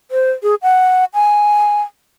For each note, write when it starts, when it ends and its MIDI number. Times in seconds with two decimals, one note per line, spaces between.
0.11 0.32 72
0.43 0.55 68
0.62 1.05 78
1.14 1.82 80